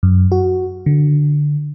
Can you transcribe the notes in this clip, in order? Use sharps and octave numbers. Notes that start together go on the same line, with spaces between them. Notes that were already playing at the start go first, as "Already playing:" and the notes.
F#2
F#4
D3